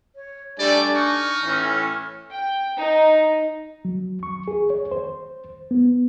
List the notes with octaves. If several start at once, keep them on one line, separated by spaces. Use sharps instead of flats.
C#5
G3 A3 D4 A4 D5 G#5
D#4 C#6 F6
A2 E3 C#4
G5
D#4
F#3
C#6
G#4
C#5
C5
B3